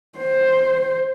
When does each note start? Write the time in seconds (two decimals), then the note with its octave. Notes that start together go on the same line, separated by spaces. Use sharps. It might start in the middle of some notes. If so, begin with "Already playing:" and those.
0.18 C5